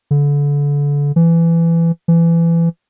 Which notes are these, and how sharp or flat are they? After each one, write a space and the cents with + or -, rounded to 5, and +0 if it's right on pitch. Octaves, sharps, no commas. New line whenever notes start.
D3 -30
E3 +20
E3 +25